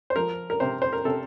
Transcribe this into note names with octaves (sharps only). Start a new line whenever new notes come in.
C5
F3 A#4
A#4
C3 C5
C5
A#4
C3 A4